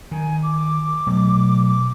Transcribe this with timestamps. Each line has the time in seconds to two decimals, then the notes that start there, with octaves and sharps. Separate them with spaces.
0.11 D#3 G#5
0.43 D6
1.07 B2 F#3 A3
1.66 D6